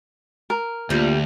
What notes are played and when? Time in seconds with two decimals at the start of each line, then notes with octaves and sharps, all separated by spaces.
0.50 A#4
0.90 D2 A#2 G3